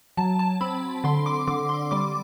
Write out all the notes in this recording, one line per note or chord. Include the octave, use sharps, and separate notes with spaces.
F#3 A5
A5
C4 B5
D3 C6
D6
D3 D6
C6
G3 D6